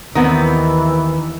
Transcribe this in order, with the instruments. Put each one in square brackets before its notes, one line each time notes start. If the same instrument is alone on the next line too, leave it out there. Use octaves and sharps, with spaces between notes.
[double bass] D#2 E3 [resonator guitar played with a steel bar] D#3 B3 C4